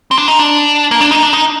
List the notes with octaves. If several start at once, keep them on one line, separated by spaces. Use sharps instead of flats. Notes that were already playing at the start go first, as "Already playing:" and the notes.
C4
D4
D#4
D4
A#3
D4
D#4
D4
D#4